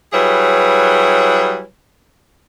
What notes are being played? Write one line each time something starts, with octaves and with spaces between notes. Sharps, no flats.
F#3 G3 E4 G#4 B4 C#5